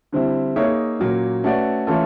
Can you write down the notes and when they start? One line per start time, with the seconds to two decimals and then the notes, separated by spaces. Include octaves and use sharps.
0.12 D3 G3 C4 E4
0.56 A#3 D#4 G#4 C#5 E5
0.99 A#2 F#3 A#3 C#4
1.44 A3 C#4 F#4 B4 D5
1.87 E3 A3 C#4 F4 A4